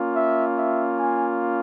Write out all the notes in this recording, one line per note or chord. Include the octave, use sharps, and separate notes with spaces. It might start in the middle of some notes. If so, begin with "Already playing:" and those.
Already playing: A#3 C#4 F4
E5
E5
G#5